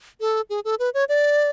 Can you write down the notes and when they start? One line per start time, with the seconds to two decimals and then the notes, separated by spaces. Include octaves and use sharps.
0.21 A4
0.50 G#4
0.65 A4
0.79 B4
0.94 C#5
1.09 D5